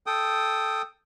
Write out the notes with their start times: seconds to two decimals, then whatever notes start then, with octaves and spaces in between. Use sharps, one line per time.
0.07 A4 G5 D#6